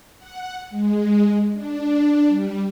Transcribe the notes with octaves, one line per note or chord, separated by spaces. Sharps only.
F#5
G#3
D4
G3